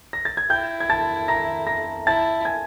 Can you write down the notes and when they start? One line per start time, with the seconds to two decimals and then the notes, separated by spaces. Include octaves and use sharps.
0.13 A#6
0.25 A6
0.37 G#6
0.50 E4 G5 G6
0.80 G#6
0.90 A5 A6
1.28 A#5 A#6
1.67 A#5 A#6
2.07 E4 A5 A6
2.45 G#5 G#6